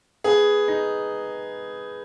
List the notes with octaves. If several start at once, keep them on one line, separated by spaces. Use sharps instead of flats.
B3 G#4
D#4